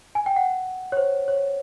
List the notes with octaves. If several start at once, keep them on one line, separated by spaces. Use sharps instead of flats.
G#5
G5
F#5
C#5
C5
C#5